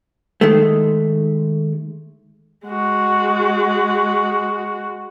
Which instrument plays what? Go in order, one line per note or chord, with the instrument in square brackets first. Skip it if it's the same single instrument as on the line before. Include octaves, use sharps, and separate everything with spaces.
[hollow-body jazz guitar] D#3 G#3 A3
[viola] G#3 F#4